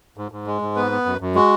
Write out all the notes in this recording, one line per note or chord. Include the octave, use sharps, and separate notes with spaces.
G#2
G#2
G#3
G#2
B3 B4
B3
F#2
F#2
G#3 F#4